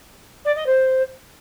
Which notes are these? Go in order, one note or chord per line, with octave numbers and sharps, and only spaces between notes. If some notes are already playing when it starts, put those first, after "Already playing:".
D5
D#5
C5